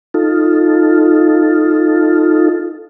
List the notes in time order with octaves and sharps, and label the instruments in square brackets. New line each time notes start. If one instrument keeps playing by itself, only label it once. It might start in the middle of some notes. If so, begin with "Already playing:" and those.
[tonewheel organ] D#4 F4 A4